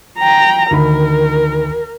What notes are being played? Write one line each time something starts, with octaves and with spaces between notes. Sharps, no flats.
G5 A#5
D2 D#3 A#4 B5